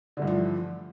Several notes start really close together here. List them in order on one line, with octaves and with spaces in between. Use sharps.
D3 A3 G2 E3 F3